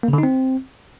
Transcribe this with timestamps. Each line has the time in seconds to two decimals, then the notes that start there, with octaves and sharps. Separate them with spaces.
0.03 A#3
0.08 C#3
0.13 D3
0.18 D#4
0.23 C4